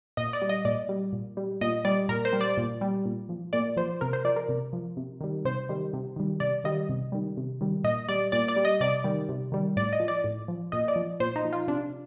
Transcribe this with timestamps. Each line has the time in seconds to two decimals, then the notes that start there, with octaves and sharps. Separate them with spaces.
0.17 A#2 D#5
0.33 D5
0.42 G3
0.49 D#5
0.65 A#2 D5
0.89 G3
1.13 A#2
1.37 G3
1.61 A#2 D#5
1.85 G3 D5
2.09 A#2 A#4
2.25 C5
2.33 G3
2.41 D5
2.57 A#2
2.81 G3
3.05 A#2
3.29 F3
3.53 A#2 D5
3.77 F3 C5
4.01 C3 A#4
4.13 C5
4.25 F3 D5
4.36 A#4
4.49 C3
4.73 F3
4.97 C3
5.21 D#3 G3
5.45 C3 C5
5.69 D#3 G3
5.93 C3
6.16 D#3 G3
6.40 C3 D5
6.64 D#3 G3 D#5
6.89 C3
7.12 D#3 G3
7.37 C3
7.61 D#3 G3
7.84 A#2 D#5
8.08 G3 D5
8.32 A#2 D5
8.48 D5
8.56 G3
8.65 D#5
8.81 C3 D5
9.04 D#3 G3
9.29 C3
9.52 D#3 G3
9.76 A2 D5
9.93 D#5
10.00 F3
10.08 D5
10.24 A2
10.48 F3
10.72 A#2 D#5
10.88 D5
10.96 F3
11.20 A#2 C5
11.36 D#4
11.45 F3
11.53 F4
11.68 C3 D4